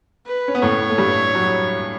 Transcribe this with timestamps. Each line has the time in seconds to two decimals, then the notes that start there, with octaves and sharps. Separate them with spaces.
0.26 B4
0.48 C#4
0.55 B3
0.62 A2 A3 C#5
0.90 A3
0.98 G2 G3
1.35 F#2 F#3